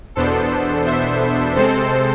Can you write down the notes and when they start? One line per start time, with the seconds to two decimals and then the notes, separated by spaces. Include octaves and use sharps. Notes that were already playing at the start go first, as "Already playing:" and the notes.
0.15 E2 B2 B3 D4 A4 C5
0.86 C5 E5
1.55 C3 G#3 C4 A4 C5